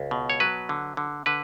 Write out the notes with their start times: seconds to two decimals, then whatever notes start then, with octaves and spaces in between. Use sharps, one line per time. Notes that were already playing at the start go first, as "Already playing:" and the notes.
Already playing: C#2
0.11 B2
0.30 C#5
0.40 F#3 B4
0.69 D3
0.97 D3
1.26 D3 B4